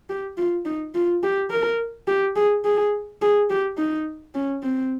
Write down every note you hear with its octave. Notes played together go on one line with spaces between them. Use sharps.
G4
F4
D#4
F4
G4
A#4
G4
G#4
G#4
G#4
G4
D#4
C#4
C4